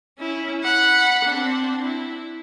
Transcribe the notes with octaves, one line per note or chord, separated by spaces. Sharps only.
C#4 E4
F#5 B5
C4 D4
E4